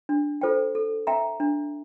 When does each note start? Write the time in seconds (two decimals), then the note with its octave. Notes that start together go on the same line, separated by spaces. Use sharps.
0.09 D4
0.41 F4 A4 C5 G5
0.75 A4
1.07 E5 G5 A#5
1.40 D4